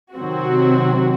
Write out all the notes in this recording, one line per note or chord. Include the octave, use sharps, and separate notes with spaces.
C3 D#3 F#3 C4 F#4